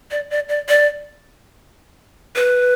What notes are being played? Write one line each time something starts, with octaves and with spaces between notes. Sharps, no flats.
D5
D5
D5
D5
B4